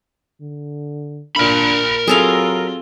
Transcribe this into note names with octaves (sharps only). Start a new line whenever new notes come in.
D3
A#2 D4 A#4 B5
F#3 C4 F4 G#4 A4 F5